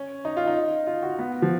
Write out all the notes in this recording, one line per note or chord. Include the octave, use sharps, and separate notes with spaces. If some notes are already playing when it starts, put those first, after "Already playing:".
Already playing: C#4
D#4
F4
D#4
F4
F#4
B3
F3